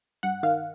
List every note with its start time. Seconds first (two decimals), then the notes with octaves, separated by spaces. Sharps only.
0.23 G2 F#5
0.43 D#3 F5